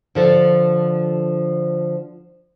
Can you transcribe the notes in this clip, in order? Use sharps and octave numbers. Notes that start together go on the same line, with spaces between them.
D3 F3 A4